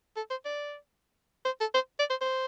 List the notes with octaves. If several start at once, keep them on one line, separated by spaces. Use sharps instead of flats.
A4
C5
D5
C5
A4
C5
D5
C5
C5